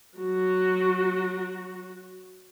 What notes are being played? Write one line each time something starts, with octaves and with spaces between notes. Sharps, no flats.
F#3 F#4